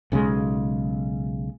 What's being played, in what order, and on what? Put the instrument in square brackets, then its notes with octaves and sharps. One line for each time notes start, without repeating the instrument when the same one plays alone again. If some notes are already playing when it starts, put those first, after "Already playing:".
[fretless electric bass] B1 C#3 E3 G#3